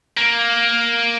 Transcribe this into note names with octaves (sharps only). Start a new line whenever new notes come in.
A#3